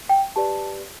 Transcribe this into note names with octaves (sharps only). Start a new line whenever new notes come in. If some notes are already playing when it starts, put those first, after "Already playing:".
G5
G4 B4 D5 A5